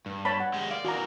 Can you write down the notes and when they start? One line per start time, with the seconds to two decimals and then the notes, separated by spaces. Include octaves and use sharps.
0.06 G2
0.25 C#5 A5 B5
0.40 F#5
0.54 G#3 G4
0.71 D5 F5
0.85 E3 F#4 A#4 A#5